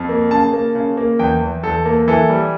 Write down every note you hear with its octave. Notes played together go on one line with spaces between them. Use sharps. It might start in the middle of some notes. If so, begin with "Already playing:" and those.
Already playing: F2
A#3
C#3 A5
A#3
C#3
A#3
E2 G5
E2
E2 A4
A#3
E3 A4
G3